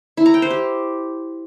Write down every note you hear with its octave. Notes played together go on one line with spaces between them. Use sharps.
E4
A#5
G5
C5
G4